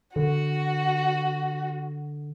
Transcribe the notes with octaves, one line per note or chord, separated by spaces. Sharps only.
D3 F#4